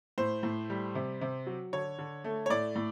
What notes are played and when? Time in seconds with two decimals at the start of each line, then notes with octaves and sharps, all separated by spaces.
0.18 A2 C5
0.43 A2
0.70 G3
0.95 C3
1.21 C3
1.47 F#3
1.73 D3 C#5
1.99 D3
2.24 A3
2.46 C#5
2.50 A2 D5
2.76 A2